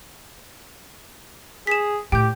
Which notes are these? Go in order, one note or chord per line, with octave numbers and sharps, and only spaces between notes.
G#4 B6 E7
A2 G4 G5 G6